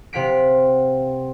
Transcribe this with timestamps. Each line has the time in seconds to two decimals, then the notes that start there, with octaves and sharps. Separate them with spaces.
0.13 C3 F5 F#5 B6 D7